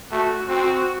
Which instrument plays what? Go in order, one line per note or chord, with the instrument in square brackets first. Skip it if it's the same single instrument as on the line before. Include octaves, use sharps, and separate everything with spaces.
[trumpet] A3 [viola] F#4
[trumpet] C4 [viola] F#4